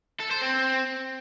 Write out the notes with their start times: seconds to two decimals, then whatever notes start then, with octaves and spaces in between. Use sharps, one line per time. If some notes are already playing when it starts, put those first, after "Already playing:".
0.20 A4
0.31 C5
0.42 C4